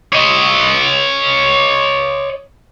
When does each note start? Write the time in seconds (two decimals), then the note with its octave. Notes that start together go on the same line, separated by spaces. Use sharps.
0.13 C#5 D#5